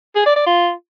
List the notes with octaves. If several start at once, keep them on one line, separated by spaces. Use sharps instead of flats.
G#4
D5
D5
F4